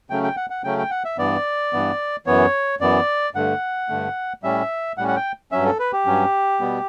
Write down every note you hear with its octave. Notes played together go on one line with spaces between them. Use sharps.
C#3 F#3 A3 C#4 G5
G5
F#5
F#5
C#3 F#3 A3 C#4 G5
G5
F#5
E5
G2 E3 B3 D5
G2 E3 B3
F#2 E3 B3 C#5
F#2 E3 B3 D5
G2 D3 A3 F#5
G2 D3 A3
A2 G3 C#4 E5
A2 G3 C#4 F#5
F#5
G5
G2 F#3 C#4 E5
A4
B4
G4
G2 F#3 C#4
B2 G3 B3